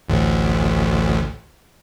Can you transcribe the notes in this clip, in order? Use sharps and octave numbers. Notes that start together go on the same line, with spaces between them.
A1 D2